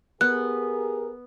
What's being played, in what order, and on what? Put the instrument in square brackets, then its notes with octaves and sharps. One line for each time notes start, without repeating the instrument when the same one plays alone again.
[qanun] B3 [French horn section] G4 G#4 A#4 [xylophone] F#6